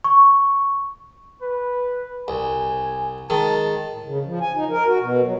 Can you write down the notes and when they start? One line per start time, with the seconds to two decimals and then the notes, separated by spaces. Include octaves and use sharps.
0.04 C#6
1.42 B4
2.28 C2 G#5
3.30 D#3 G#3 A5
3.91 A2
4.03 C#3
4.25 F3
4.41 G#5
4.54 D#4
4.70 A#4
4.86 F#4
5.00 B2
5.23 F#3